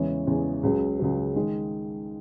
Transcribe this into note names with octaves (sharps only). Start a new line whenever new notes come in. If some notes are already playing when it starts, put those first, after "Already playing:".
Already playing: E2 C#3 E3 G#3 C#4
E2 C#3 E3 G#3 C#4
C#2 C#3 F#3
C#2 C#3 F#3
D#3 G#3